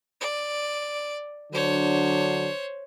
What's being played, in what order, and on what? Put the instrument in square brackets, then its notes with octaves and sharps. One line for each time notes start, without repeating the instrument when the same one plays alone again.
[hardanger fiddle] D5
[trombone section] D3 F#3 D4 [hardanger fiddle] C5 C#5